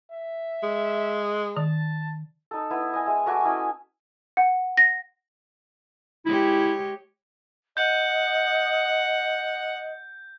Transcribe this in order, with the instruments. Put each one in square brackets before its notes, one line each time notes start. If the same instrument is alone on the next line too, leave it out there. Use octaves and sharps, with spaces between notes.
[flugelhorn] E5
[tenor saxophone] G#3
[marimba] D#3 [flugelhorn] A5
[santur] D#4 A4
B3 E4
D#5 G#5
G#3 E5
A3 F#4 G#5 D6
C#4 E4 D#5
[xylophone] F#5
A#6
[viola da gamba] G#3 G4 C#5 [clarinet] E4
[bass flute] D#5 [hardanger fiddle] F#5 [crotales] G6